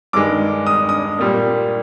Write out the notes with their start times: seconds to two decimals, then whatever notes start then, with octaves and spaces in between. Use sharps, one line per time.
0.13 G2 D#3 G#3 D6
0.67 D#6
0.89 D#6
1.19 A#2 G3 A#3